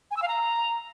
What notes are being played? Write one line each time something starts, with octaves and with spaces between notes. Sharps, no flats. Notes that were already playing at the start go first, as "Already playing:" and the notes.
G#5
E6
F5
A#5